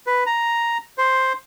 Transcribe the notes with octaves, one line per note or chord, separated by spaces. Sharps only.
B4
A#5
C5